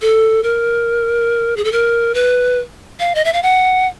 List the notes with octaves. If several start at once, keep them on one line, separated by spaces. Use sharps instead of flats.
A4
A#4
G#4
A4
A#4
B4
F5
D#5
E5
F5
F#5